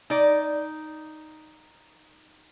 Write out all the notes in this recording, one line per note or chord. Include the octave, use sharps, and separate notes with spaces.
D#4 D5